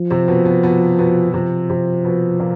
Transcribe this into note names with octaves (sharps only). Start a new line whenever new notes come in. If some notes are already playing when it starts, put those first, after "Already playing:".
Already playing: F3
C3 C4
B2 B3
B2 B3
B2 B3
B2 B3
C3 F3 C4
C3 C4
B2 B3
A#2 A#3